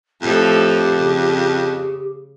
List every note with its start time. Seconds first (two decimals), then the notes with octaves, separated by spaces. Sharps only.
0.22 F2 A2 F3 G4 A4
0.95 C#3